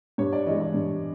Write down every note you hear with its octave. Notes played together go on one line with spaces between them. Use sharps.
G2 C#5
D5
E3 G#3 D#5
D5
G2